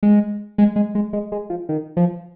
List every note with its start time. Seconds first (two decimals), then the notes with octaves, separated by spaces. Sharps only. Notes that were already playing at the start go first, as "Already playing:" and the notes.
0.03 G#3
0.58 G#3
0.76 G#3
0.95 G#3
1.13 G#3
1.32 G#3
1.50 F3
1.69 D#3
1.97 F3